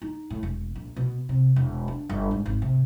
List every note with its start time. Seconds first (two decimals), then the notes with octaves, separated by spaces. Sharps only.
0.02 D#4
0.30 A2
0.43 E1
0.75 A#1
0.96 B2
1.29 C3
1.56 E1
1.88 D4
2.09 G1
2.31 G#2
2.46 G#1
2.62 C3